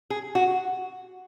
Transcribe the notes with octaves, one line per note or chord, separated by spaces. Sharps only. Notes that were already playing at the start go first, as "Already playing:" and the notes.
G#4
F#4